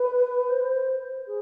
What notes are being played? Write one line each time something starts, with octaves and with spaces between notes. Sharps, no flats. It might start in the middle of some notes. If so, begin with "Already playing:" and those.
Already playing: B4
C5
G#4